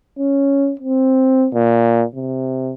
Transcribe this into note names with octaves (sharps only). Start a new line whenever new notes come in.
C#4
C4
A#2
C3